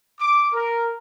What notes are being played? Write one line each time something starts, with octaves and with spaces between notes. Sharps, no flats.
D6
A#4